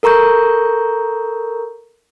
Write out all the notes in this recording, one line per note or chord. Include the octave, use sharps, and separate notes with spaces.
A4 A#4 A#5 C#6 G6